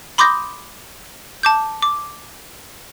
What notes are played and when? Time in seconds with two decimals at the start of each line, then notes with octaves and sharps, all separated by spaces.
0.18 B5 C6 D6 D#6 G6 A#6
1.43 A5 D6 G6
1.82 D6